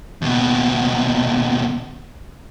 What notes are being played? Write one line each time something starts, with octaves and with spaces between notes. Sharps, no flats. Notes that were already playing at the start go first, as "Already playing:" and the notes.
D#2 B2